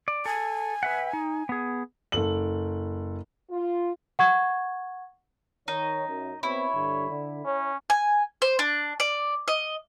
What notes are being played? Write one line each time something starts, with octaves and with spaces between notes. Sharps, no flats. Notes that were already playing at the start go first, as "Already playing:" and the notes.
D5
A4 G#5
B4 E5 F#5
D#4
B3 G#4
F#1 A4 F#7
F4
F#5 C#6 G#6
D#3 D#4 C#5
F#2
B2 C4 E4 C#5
G2 D3
D3
C#4 C#5
G#5
C5
D4
D5
D#5